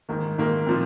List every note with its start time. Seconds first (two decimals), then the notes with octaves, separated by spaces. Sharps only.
0.09 G#2 D#3 A#3
0.38 G#2 D#3 A#3
0.67 A#2 F3 C4